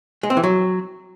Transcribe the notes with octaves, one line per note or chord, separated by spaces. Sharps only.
G#3
C4
E3
F#3